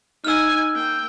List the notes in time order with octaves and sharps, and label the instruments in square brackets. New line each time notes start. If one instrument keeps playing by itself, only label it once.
[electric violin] D#4 G#5 [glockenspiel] E6 F6
[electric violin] A#3 G5